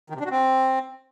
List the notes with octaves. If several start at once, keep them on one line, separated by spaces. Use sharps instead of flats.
D#3
C3
D4
F#4
C4